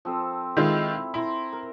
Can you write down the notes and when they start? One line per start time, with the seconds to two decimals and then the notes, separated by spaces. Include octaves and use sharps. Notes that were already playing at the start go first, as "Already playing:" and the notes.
0.05 F3 C4 A4
0.57 D#3 G#3 E4 F4
1.14 E4 C5 A#5 C6
1.53 A#4